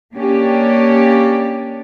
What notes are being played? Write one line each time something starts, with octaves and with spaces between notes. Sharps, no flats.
A#3 C#4 D4 G4